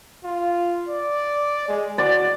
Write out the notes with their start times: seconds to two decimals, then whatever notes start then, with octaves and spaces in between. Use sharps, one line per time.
0.24 F4
0.89 D5
1.69 G#3
1.98 F#4 D5